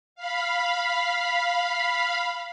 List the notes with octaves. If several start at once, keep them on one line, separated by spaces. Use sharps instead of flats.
F5 B5